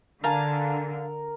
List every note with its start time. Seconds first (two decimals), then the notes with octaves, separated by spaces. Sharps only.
0.24 D3 A#4 F5 G#5 A5